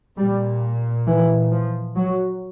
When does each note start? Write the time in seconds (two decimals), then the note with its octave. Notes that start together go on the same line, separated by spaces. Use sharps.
0.18 A#2 G3
1.07 E3
1.52 F3
1.96 F#3